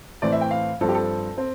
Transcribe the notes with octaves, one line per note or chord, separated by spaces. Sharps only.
A2 E3 A3 C4 D5
E5
G5
F5
G2 F3 C4 A4
G4
A4
C4